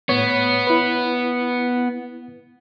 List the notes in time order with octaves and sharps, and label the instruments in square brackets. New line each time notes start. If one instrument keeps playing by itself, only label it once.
[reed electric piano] A2 C#5 [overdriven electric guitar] B3
[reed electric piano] E4 B4